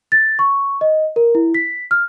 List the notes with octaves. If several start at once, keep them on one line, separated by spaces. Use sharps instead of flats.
A6
C#6
D#5
A#4
E4
B6
F6